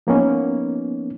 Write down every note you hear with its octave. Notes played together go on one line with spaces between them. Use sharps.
F3 A#3 B3 C#4 D#4